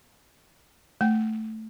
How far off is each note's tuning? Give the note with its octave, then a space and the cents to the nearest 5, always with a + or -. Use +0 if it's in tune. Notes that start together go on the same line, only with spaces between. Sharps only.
A3 +0 G5 +0